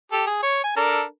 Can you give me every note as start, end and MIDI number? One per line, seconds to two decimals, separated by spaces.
0.12 0.25 67
0.12 0.25 69
0.27 0.38 68
0.43 0.63 73
0.64 0.76 80
0.76 1.03 62
0.76 1.03 69
0.76 1.03 70